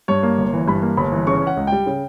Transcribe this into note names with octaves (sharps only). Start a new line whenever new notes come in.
G2 C#5
A#3
G1
E3
G2 B5
A#3
G1 B5
E3
C#3 C#6
C#4 F#5
C#2
G3 G5
C#3